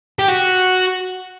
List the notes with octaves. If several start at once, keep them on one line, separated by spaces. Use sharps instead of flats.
G4
F#4